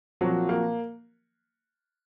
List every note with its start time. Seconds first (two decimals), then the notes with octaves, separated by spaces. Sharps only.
0.21 A#2 F3 F#3 C4 F#4
0.49 A#3